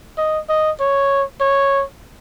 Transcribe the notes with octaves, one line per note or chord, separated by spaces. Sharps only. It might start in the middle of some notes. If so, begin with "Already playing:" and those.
D#5
D#5
C#5
C#5